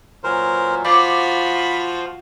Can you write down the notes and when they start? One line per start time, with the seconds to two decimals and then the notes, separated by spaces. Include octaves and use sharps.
0.24 A#2 E3 F#3 A#4 C5
0.85 F3 F4 F#4 C5 D5 F5 B5